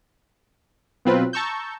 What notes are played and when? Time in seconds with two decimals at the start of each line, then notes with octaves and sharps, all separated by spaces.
1.05 B2 F#3 C4 F4 B4
1.33 A5 A#5 C#6 E6 G6